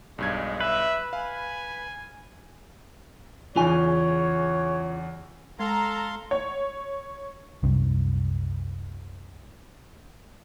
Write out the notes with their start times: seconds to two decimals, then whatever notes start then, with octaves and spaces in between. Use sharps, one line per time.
0.18 B1 G2 G#3 G#6
0.60 B4 E5
1.13 F5 G#5
3.56 E2 C#3 E3 F4 C#5 G#5
5.60 G#3 A4 F5 A#5 C6
6.31 C#5
7.63 C2 F#2 C3 G3